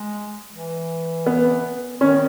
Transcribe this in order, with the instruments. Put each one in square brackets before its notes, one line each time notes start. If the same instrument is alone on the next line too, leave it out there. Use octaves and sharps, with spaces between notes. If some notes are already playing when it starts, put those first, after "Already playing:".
Already playing: [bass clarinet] G#3
E3
[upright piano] B3
[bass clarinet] D#3 [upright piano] C#4